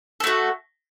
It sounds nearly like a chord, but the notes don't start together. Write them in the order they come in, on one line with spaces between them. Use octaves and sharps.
A4 A3 F#4